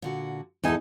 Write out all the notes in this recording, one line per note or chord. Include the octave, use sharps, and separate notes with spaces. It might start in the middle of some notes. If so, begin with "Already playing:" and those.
A#2 D3 F#4
E2 A#2 D#4 G#4 A4 G#5